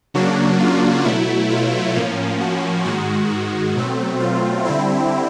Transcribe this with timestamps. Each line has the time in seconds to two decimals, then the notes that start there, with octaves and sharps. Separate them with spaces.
0.14 C#3 F#3 A#3 D4 F#4
0.60 F4
1.05 B2 F#3 A3 E4
1.50 F4
1.95 A2 F3 A#3 C#4
2.40 F#4
2.85 G#2 D#3 G#3 F#4
3.30 F#4
3.75 B2 F#3 A3 C4
4.20 F4
4.65 D3 G3 C4 E4